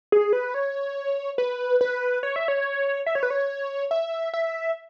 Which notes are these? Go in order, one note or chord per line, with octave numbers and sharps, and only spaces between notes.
G#4
B4
C#5
B4
B4
C#5
E5
C#5
E5
C#5
B4
C#5
E5
E5